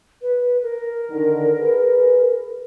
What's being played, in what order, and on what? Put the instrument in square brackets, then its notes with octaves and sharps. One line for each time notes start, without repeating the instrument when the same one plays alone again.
[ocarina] B4
A#4
[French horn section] D3 D#3
G#4 B4